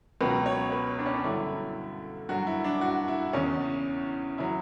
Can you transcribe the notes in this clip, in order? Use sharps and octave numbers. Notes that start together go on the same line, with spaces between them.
C#2 B2 F#3 B4
C#5
B4
D4
C#4
D4
G2 D3 F#3 E4
G2 F#3 F#4
E4
D4
F#4
E4
E2 C#3 E3 C#4
C#3 F#3 E4